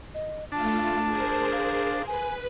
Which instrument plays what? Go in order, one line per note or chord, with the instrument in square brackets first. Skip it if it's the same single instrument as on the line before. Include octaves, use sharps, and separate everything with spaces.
[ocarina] D#5
[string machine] A3 F4 [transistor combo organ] D4 [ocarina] A5
[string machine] G#4 A#4 C5
[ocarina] F5
[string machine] B4 [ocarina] G#5